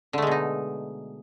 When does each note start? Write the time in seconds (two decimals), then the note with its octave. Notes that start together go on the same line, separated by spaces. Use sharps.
0.13 D3
0.18 A3
0.22 G#3
0.27 B2
0.31 D#4